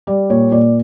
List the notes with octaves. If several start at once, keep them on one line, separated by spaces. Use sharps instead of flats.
G3 D5
A#2 C#5
A#2 D5